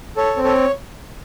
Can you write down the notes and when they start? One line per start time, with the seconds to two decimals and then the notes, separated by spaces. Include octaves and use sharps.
0.17 A4 C#5
0.37 C4
0.44 A4 C#5